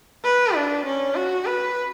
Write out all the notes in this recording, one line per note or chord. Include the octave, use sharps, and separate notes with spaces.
B4
D4
C#4
F#4
B4